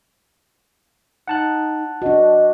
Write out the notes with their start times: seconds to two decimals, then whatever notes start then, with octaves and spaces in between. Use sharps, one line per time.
1.28 D#4 F#5 A5 F#6
2.02 D4 F#4 D#5